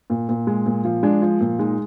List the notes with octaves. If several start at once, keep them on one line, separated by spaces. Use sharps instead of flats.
A#2
A#2
G#3
A#2
F3
G#3 D4
F3
A#2
G#3 D#4